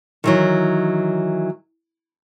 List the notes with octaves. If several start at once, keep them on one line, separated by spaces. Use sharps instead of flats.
D#3 E3 F#3